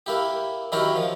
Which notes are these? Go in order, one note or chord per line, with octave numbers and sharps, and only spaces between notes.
A#3 E4 G4
D#3 F#3 E4 G4 A#4 C#5
F3